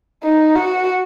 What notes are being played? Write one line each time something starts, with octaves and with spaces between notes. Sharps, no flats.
D#4
F#4